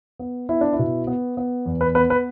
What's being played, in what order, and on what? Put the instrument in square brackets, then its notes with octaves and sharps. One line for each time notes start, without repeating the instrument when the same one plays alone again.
[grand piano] B3
B3 E4
D4
E4
B2
B3
B3
E2
B4
B3 B4
B4